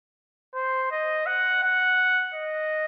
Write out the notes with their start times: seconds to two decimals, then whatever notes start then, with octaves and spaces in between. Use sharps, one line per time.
0.55 C5
0.92 D#5
1.26 F#5
1.64 F#5
2.35 D#5